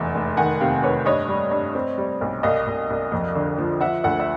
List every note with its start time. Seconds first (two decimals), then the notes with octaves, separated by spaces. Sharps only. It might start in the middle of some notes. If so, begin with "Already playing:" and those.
Already playing: F1 E2 E5
0.15 F1
0.37 D#3 F#5 G#5
0.60 C3 F5 G5
0.83 D#3 B4 C#5
1.05 G2 C#5 D#5
1.28 G3
1.51 G2
1.75 C4
1.98 G3
2.21 B1
2.43 C2 D#5 F5
2.67 C2
2.90 C2
3.12 F2
3.35 D3
3.58 F3
3.81 F3 E5 F#5
4.04 D2 E5 F#5
4.19 E5